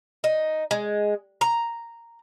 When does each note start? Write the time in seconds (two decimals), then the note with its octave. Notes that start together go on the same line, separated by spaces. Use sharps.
0.24 D#4
0.71 G#3
1.41 A#5